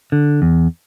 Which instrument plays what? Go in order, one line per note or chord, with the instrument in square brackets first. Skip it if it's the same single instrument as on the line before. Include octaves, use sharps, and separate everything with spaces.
[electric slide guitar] D3
E2